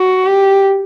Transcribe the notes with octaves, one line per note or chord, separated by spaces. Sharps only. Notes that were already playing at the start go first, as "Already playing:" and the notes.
Already playing: F#4
G4